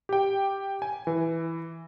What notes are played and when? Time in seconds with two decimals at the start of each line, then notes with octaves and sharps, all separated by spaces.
0.09 G4 G5
0.82 G#5
1.07 E3